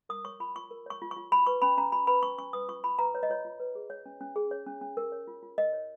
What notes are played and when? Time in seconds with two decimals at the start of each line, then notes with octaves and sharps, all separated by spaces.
0.09 A#4 D#6
0.25 C#5 C#6
0.40 F4 B5
0.56 F4 C#6
0.71 A#4
0.86 C#5 C#6
1.02 F4
1.11 C#6
1.17 F4
1.31 F#4 B5
1.47 B4 C#6
1.62 C#4 B5
1.78 C#4 A#5
1.92 F#4 B5
2.07 B4 B5
2.22 C#4 C#6
2.38 C#4 C#6
2.53 B4 D#6
2.69 F4 C#6
2.84 F4 B5
2.99 B4 A#5
3.14 B4 C#5
3.23 D#5
3.30 F4 C#5
3.45 F4
3.60 B4
3.75 G#4
3.90 C#5
4.06 C#4
4.21 C#4
4.36 G#4
4.51 C#5
4.67 C#4
4.81 C#4
4.97 A#4
5.12 C#5
5.27 F4
5.43 F4
5.58 A#4 D#5
5.73 C#5